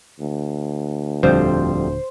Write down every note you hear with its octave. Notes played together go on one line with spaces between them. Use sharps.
D2
D#1 F2 D3 G3 C5